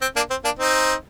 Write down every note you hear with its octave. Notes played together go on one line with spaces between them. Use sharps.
C4
A#3 D4
C4
A#3 D4
C4 D#4